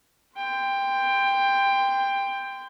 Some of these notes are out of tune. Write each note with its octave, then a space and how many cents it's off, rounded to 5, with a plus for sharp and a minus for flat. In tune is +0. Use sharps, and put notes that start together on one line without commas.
G5 +15 C6 -20